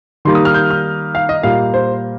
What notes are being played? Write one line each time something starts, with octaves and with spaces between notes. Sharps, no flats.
D#3 G3 A#3 C6
D#6
F6
G6
F6
F5
D#5
A#2 G3 A#3 F5
C5